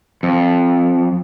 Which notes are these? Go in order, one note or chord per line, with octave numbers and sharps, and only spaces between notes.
F2